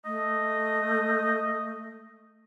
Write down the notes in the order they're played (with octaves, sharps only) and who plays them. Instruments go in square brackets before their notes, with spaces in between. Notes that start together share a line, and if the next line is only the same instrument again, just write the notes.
[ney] A3 [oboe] D#5